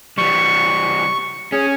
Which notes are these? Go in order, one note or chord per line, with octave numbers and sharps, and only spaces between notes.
E3 G3 C#6
C#4 G#4